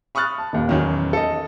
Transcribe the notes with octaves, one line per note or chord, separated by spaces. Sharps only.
B5 C#6 D#6 F6 F#6 A6
A5
D#1 D#2
E2 D#3 F#3 C#4
A4 D#5